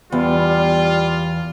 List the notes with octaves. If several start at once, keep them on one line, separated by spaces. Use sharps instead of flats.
E2 G3 F4